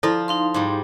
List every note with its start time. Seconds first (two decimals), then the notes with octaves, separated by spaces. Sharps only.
0.03 F3 E4 F4 A4 D5
0.28 D#4 F5 C6
0.54 G#2 G3